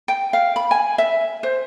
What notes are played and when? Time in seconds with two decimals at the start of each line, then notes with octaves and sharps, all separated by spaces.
0.08 G5
0.33 F5
0.56 B5
0.71 G#5
0.98 E5
1.43 C5